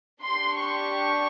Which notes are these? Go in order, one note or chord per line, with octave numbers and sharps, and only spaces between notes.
D4 G4 C6
C#6